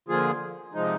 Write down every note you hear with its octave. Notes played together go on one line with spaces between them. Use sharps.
D3 F3 A#3 F4 G#4
C3 F3 G#3 D#4